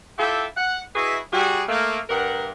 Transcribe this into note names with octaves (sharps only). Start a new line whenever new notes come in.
E4 F4 G4 A4 E5 G5
F#5
E4 F#4 G#4 B4 D#5 E5
G3 F#4 G#4
A3 A#3
G2 A#4 F#5